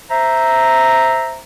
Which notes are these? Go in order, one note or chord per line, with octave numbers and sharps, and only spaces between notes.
C5 E5 A#5